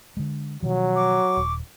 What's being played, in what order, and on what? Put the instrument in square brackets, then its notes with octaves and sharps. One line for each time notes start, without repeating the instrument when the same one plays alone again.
[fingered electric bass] D3 G#3
[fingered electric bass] B2 D#3 F3 [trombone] F#3
[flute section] C#6 D6
[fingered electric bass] D#1